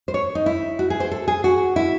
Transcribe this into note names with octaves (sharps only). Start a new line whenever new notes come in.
C5
C#5
D#4
E4
F#4
G#4
C5
A4
G#4
F#4
E4